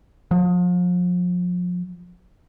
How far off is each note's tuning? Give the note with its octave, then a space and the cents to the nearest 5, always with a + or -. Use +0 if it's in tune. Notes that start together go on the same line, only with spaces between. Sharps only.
F3 +35